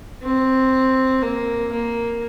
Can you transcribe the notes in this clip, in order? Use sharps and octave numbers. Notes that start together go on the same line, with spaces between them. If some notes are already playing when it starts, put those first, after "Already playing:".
C4
A#3
A#3